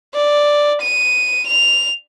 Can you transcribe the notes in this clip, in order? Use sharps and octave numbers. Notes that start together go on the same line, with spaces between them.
D5
D#7
F7